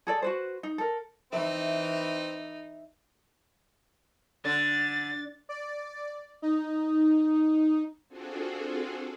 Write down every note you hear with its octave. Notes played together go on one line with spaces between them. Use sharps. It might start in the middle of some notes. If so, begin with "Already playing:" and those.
G#4 A4 D5
F#4 B4 C5
D#4
A4 A#4
E3 C4 D#4 E5
D3 A6
D5
D#4
C4 D4 F4 F#4 G#4 A4